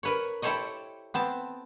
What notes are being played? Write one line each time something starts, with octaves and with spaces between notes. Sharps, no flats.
A#4 B4 C#5
E4 G4 A4 C5 C#5 D#5
B3 C4 A5